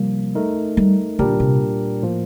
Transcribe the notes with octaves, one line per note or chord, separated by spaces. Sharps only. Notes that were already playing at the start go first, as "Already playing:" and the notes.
Already playing: C3 F3 G3 A#3
A3 D#4 A#4
G3
A#2 D3 G3 D4 G4 A#4
C3
A2 F3 A#3